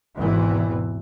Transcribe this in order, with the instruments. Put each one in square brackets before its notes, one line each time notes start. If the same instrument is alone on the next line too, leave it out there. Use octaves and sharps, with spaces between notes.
[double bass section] G#1 E2 B2 E3 C4